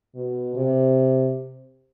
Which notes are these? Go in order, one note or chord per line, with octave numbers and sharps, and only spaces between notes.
B2
C3